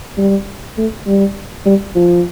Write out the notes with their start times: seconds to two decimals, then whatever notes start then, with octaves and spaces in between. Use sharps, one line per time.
0.18 G3
0.78 A3
1.07 G3
1.66 G3
1.95 F3